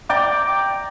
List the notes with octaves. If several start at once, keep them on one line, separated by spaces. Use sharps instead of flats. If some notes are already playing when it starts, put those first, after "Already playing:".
D5 G5 A#5 D6